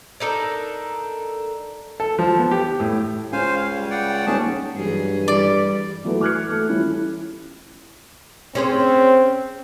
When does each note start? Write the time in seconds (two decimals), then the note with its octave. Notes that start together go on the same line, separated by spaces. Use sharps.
0.20 D4 D#4 A4 A#4
2.00 A4
2.19 F3
2.39 B3
2.51 G4
2.80 A2
3.32 C#2 C5 F5 G#5
3.56 F5
3.76 G3
3.90 D5 F#5 G5
4.26 D#1 C#4 G#4 A5
4.74 G2 E3 F#3 G#4
5.28 G3 D5
6.04 E3 F#3 A3 E4 F#4 B4
6.21 D6 F6 F#6 G#6 C#7
6.51 A3
6.68 E3 G3 C#4 E4 F4
8.55 C4 C#4 G#4 C5